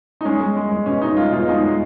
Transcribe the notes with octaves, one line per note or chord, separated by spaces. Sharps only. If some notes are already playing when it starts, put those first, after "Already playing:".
D#4
G#3 C#4
G#3
G#3
G#3
B2 C#4
B2 D#4
G#3 F4
B2 F4
G#3 D#4
G#3